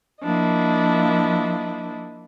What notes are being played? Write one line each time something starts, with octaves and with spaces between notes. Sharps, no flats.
F3 A#3 D4 E4 D#5